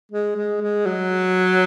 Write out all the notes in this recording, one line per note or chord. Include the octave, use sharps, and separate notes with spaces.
G#3
G#3
G#3
F#3